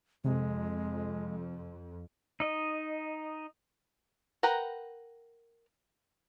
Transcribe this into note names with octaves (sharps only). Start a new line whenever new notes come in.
F2 C3 G#3
D#4 D#5
A#4 B4 F#5 G5 A#5